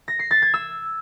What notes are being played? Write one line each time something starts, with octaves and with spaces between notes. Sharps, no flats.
A#6
C7
A6
G#6
E6